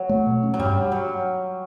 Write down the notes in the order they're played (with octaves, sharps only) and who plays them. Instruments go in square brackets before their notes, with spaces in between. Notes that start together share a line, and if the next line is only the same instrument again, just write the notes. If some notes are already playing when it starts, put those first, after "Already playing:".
Already playing: [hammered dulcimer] F#3
[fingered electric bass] A3
B2
C#4
[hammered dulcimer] F#3
[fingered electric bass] G2 [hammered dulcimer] G3
[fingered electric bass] G2
[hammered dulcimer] F#3